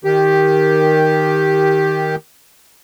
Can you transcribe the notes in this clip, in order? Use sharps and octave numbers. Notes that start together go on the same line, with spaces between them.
D#3 G4